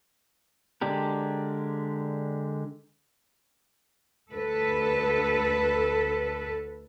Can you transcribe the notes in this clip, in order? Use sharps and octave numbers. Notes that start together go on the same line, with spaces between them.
D3 G#3 D4 G4 A#4
D2 A4 B4